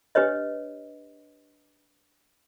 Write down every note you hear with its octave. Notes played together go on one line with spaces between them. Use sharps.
D4 G4 B4 C#5 D#5